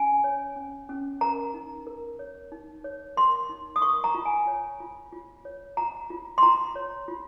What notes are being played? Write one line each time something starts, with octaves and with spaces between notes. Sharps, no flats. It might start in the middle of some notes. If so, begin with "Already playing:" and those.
Already playing: C#4 G#5
C#5
C#4
C#4
A#4 A#5
D#4
A#4
C#5
D#4
C#5
A#4 C6
D#4
D#6
A#4 C#6
A#5
F4
G#5
C#5
F4
F4
C#5
F4 A#5
F4
C6
F4 A#5
C#5
F4